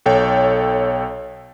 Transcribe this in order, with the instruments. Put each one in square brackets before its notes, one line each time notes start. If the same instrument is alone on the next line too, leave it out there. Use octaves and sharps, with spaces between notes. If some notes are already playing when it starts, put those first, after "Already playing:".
[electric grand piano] B1 A4 C#5 G5